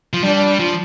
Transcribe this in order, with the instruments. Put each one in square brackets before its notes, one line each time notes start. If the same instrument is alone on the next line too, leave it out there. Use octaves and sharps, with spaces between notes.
[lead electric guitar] F3
[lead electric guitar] G3 [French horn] D4
[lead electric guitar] F3